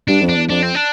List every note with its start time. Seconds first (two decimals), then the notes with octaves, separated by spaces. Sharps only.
0.08 G2 D4
0.22 F2
0.29 D4
0.36 E2
0.50 F2 D4
0.63 C4
0.75 D4